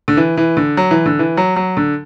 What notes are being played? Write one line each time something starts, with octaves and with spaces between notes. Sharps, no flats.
D3
E3
E3
D3
F#3
E3
D3
E3
F#3
F#3
D3